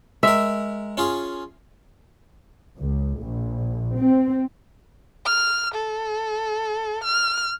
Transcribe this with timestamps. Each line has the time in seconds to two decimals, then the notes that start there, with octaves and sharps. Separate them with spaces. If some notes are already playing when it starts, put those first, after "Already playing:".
0.23 G#3 A#4 E5
0.97 C#4 F4 G#4
2.78 C#2
3.19 A#1
3.97 C4
5.25 F6
5.74 A4
7.03 F6